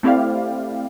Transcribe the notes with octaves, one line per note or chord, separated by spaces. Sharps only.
A3 C4 E4 G4 D5 F5